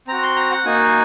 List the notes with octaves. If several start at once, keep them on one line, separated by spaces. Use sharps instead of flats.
C4 F#4 A#5
C6
A#5
F#5
A#3 D#4 F#4 G#5